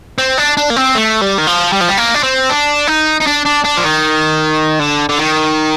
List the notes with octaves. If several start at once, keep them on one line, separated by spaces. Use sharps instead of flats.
C4
D4
D4
A#3
C4
A3
G3
D#3
F3
G3
F3
G3
A#3
D4
C4
D4
D#4
D#4
D4
D4
D4
F3
D#3
D3
D3
D#3